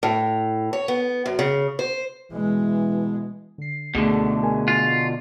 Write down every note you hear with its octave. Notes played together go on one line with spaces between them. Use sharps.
A2
C#5
B3
F#2
C#3
C5
B2 E3 G#3
D3 C7
C#2 B2 D3 A3 G#4
G#4 A#4 G#5
F4